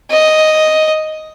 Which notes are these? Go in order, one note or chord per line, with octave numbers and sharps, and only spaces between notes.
D#5